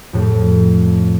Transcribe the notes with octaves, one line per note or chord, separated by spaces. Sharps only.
F2 A2